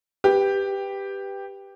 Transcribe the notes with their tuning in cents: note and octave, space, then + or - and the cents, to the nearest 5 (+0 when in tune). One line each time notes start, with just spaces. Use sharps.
G4 +5 B4 +0